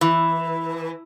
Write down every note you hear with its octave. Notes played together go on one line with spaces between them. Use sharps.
E3